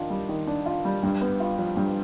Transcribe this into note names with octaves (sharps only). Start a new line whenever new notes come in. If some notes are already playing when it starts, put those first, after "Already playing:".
Already playing: D#3 D4 F4
G3
D#3
D4
F4
G3
G2
B3
F4
F3
G2